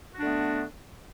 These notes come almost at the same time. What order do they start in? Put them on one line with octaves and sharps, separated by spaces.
F#4 D4 D3 A3 B3